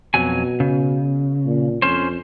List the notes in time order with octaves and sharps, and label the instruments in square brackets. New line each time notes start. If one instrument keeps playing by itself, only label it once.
[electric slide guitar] F2 F#3 G#5 [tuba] B2
[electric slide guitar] C#3
[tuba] A#2
[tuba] F2 [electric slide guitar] C#4 C5